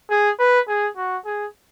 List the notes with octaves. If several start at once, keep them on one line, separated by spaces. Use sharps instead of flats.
G#4
B4
G#4
F#4
G#4